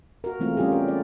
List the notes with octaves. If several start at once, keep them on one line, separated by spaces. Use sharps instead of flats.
F#4 A#4
E3 G#3 A3 B3 C4 F4
G3 C#4 F4 G4 G#4
A#4
D5